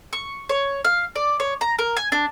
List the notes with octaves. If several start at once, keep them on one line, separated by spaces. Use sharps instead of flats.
C#6
C#5
F5
D5
C#5
A#5
A#4
G#5
D4